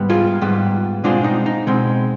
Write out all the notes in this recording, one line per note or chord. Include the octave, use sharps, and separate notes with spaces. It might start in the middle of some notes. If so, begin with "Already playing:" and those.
Already playing: G#2 G3 B3
F4 G#4
G#2 G3 B3
B2 G#3 C4 D4 F4
D#4
D#4
B2 G#3 C4